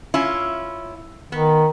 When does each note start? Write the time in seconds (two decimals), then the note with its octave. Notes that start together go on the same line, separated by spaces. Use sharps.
0.14 C#4 E4 F4
1.32 D#3 B3